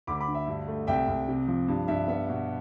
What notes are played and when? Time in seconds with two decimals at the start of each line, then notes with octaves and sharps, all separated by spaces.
0.07 D2 B5 D6
0.20 B5 D6
0.28 D3
0.34 E5
0.47 G2
0.68 A3
0.87 C2 E5 G5
1.08 C2
1.28 C3
1.48 F3
1.68 G2
1.88 G2 E5
2.08 B3 E5
2.29 B2